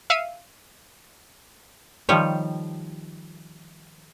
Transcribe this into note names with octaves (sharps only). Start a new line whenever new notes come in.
E5 F5 C7 C#7 D#7
D#3 F3 G3 C#5